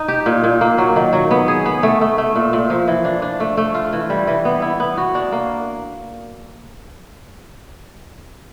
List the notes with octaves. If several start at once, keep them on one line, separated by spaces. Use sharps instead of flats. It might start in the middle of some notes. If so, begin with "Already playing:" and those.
Already playing: D#4
G4
A#2
A#2
A#3
F#3
D#3
F#3
B3
G#4
B3
A3
A3
A3
A#2
A#2
F3
E3
D4
D4
A3
A3
F4
E3
G3
E3
B3
E4
B3
F#4
D4
A#3